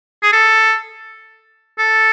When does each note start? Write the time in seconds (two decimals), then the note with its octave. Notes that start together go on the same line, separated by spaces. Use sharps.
0.23 G#4
0.32 A4
1.78 A4